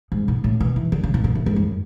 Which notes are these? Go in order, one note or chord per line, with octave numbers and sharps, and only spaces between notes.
G#2
B2
A2
B2
E3
D3
C#3
B2
B2
A2
G#2
F#2